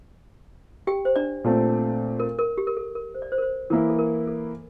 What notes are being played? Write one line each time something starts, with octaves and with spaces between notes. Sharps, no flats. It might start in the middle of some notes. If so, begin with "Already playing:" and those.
G4 G5
C5
D4 D5
A#2 A3 C4
A#4
A#4
G4
A#4
A4
A#4
C5
D5
C5
A#4
C5
E3 A#3 E4 A#4
A4
A#4
A4